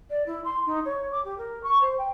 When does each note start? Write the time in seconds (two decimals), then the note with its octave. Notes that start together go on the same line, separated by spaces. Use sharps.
0.10 D5
0.26 E4
0.44 C6
0.66 D#4
0.85 C#5
1.12 D6
1.24 G4
1.38 A#4
1.63 C#6
1.81 C5
1.98 G5